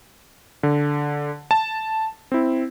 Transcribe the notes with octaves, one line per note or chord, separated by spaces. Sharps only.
D3
A5
C4 E4